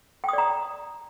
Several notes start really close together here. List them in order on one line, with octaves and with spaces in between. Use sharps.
G5 D#6 D5 A#5